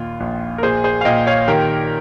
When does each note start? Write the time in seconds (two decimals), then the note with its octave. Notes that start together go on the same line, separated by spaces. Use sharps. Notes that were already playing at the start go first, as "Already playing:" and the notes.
Already playing: D#2 A#2 F4
0.20 A#1
0.58 A#4
0.63 A#2 G#4 C5
0.84 G#4 C5
1.01 F5
1.05 A#2 D#5 G5
1.27 C#5 F5
1.48 D#3 G4 A#4